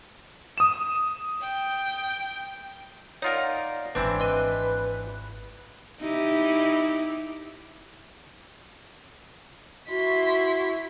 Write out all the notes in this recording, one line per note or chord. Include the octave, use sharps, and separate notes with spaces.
D#6 E7
G5
D#4 F4 A#4 C#5 D5 F#5
G#1 G#2 E3 C4 D4 B4
B4 D#5 C6 D#7
D#4 E4 G4
E4 F#4 C6 B6